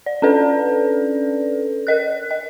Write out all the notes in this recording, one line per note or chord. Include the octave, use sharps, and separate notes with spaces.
D5
C#4 D4 A4 B4 D5
A#4 D#5 F#6
D#5